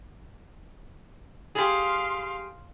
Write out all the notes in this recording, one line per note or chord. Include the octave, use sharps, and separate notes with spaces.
G4 G#4 F5 C6